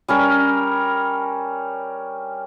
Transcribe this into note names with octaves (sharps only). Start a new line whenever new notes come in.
G3 C#4 A#4